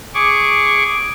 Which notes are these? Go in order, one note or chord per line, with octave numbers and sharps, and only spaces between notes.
G#4 C#6 D6